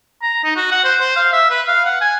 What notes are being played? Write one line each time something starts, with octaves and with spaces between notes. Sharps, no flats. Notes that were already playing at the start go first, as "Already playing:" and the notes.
A#5
D#4
F#4
F#5
C5
C5
F5
E5
B4
F5
F#5
G#5